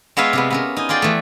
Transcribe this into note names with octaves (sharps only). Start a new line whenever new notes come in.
G#3 B3 F4 C#5 E5 F5
C3 G#3 B3
B3 C#4 A#4
D#4 G#5
F4 G#4 D5 G5
E3 A3